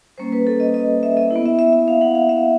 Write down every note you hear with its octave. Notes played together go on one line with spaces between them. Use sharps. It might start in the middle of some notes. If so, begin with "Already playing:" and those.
G3 A#3 C#4 C5
B4
A4
D#5
D#5
E5
D#5
E4
B3
E5
E5
E5
F5
F#5
F5
E5